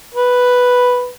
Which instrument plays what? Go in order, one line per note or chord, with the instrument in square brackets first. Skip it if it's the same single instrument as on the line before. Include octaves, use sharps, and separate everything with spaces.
[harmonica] B4